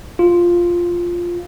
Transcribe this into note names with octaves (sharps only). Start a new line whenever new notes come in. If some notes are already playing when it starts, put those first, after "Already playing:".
F4